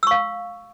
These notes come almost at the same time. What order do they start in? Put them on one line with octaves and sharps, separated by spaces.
E6 C#6 F5